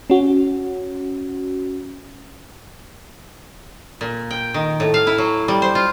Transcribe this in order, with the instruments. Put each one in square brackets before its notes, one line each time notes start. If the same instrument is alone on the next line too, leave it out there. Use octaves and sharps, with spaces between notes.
[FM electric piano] C#4 F#4
[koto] A#2
G5
D#3
A2
F5
E4
F#3
G3
C5
F4